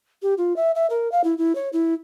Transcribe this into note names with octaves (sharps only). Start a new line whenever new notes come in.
G4
F4
E5
E5
A#4
F5
E4
E4
C#5
E4